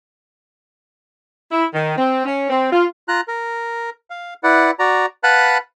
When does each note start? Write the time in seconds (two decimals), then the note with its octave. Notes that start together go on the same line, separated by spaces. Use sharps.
1.51 E4
1.74 D#3
1.97 C4
2.25 C#4
2.50 C4
2.72 F4
3.08 F4 A#5 F#6
3.28 A#4
4.10 F5
4.43 E4 B4 D5 F#5
4.79 F#4 D5 A#5
5.23 B4 F5 F#5 A5 B5 F#6